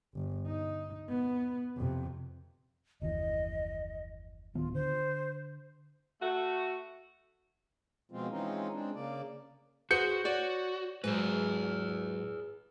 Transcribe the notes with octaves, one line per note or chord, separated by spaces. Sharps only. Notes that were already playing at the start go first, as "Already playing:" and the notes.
G1
D#4
B3
F2 C3
F#1 D#2 E3 D#5
D1 D#3 B3 F4
D3 C5
A3 F#4
B2 F3 G#3 C4 F4
E3 G#3 C4 C#4 D#4 F4
G#3 C4 D4
C#3 A#3 D5
F#4 G#4 B4 C5 G6 C#7
F#4 C#5 D5
G#2 F#3 G#4 B4